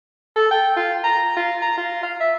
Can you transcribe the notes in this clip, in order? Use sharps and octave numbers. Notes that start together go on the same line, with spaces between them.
A4
G5
F4
A#5
F4
A#5
F4
F5
E5